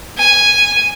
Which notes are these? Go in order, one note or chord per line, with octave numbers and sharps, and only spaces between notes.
G#5